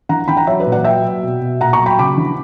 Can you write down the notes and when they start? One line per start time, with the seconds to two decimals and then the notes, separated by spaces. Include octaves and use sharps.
0.09 E3 F#5 A#5
0.28 E3 G5 B5
0.37 F#5 A#5
0.47 F#3 C#5 E5
0.60 B4 D5
0.66 A#2
0.72 D5 F#5
0.84 F#3 E5 G5
1.03 F#3
1.23 B2
1.41 B2
1.61 A#2 F#5 A#5
1.73 A#5 C#6
1.80 F#3
1.86 G5 B5
1.98 C#3 B5 D6
2.17 E3